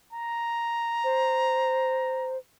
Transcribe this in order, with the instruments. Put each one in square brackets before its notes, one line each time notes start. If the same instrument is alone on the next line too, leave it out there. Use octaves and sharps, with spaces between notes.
[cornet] A#5
[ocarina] C5